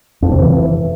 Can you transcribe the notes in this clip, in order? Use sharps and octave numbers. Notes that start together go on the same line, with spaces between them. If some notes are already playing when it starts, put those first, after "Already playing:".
F2
C3
E3